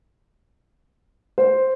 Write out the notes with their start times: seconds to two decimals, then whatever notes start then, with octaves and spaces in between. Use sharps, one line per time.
1.38 C5